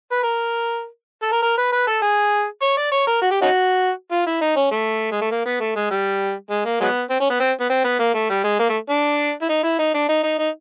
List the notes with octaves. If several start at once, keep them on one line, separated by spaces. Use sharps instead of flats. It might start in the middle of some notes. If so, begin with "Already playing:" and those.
B4
A#4
A4
A#4
A#4
B4
B4
A4
G#4
C#5
D5
C#5
A#4
F#4
G4
C#4 D#4 F#4
F4
E4
D#4
C#4
A3
G#3
A3
A#3
B3
A3
G#3
G3
G#3
A#3
F#3 G#3 B3
C4
C#4
B3
C4
B3
C4
B3
A#3
A3
G3
G#3
A#3
A3
D4
E4
D#4
E4
D#4
D4
D#4
D#4
D#4